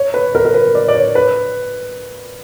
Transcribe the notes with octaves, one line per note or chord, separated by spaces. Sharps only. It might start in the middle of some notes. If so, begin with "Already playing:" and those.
Already playing: C#5
B4
A#4
A#4
B4
D5
D5
C#5
B4